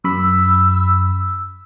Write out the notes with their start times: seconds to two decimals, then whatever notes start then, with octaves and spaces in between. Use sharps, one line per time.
0.04 F#2 B5 E6